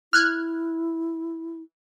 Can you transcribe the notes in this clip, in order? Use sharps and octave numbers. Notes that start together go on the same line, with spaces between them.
E4 F6 F#6 G#6